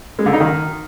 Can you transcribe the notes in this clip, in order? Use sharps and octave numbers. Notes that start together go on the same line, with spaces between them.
G#3
D3
D#4
D#3